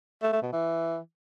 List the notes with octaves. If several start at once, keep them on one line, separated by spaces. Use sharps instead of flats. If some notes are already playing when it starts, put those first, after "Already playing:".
A3
A3
B2
E3